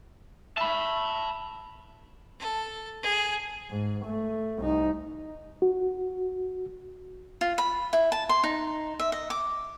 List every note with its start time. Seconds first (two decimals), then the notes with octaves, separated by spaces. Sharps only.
0.57 E5 A5 B5
2.39 A4
3.03 G#4
3.71 G#2
4.05 A3
4.58 C2 D#4
5.62 F#4
7.41 F4
7.58 B5
7.93 E4
8.12 A5
8.29 C6
8.44 D#4
8.99 E5
9.12 D#5
9.30 D6